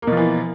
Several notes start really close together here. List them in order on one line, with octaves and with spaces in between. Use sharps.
A#3 B2 F3 E3